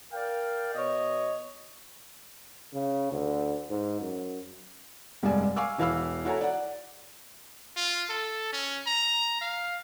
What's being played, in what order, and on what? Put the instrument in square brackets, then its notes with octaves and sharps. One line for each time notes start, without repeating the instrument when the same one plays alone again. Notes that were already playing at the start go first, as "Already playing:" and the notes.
[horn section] A#4 D5 F5 G5
B2 C#5 D#5
[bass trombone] C#3
D2
G#2
F#2
[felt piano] F1 G2 G3 G#3 D5 G#5
F5 G#5 C#6 D6 E6
E1 E3 F5 B5 E6
E4 F#4 A4 C#5 G#5 A#5
D5 F#5
[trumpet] F4
A4
C#4
A#5
F5